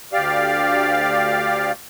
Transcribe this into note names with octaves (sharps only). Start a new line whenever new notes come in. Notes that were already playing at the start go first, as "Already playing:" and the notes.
D2 G4 D5 F5